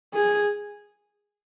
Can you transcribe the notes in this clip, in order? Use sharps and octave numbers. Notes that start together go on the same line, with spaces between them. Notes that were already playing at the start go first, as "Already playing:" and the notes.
G#4